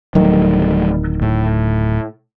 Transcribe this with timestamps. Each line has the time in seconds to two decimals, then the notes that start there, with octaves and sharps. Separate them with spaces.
0.15 D1 D#3 F#3 G3 A3
1.22 A2